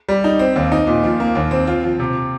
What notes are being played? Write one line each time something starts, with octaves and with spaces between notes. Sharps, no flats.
G3
D#4
C4
D#2
D#4
A#2
F3
A#3
D#2
C4
F4
F3
C3